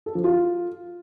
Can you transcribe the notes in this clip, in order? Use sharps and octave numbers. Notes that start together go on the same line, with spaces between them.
A4
F3
F4